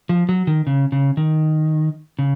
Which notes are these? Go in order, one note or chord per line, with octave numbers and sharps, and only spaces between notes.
F3
F#3
D#3
C#3
C#3
D#3
C#3